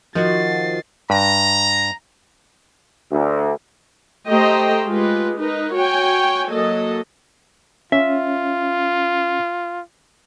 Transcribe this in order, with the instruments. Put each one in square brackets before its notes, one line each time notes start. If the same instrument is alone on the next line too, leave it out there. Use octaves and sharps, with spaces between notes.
[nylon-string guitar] D#3 [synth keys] F3 F#4 [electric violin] A6 C7
[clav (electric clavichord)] G2 [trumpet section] A#5
[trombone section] D2
[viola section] A3 G4 C5 D#5 G5 A#5
G#3 F4 G4 B4
D#4 A#4 B4
F#4 C#5 G5 G#5
F#3 A#3 A4 D#5
[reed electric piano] C#4 [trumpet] F4 [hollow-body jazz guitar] E5